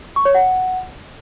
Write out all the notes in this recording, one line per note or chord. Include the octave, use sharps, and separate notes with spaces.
C#6
C#5
F#5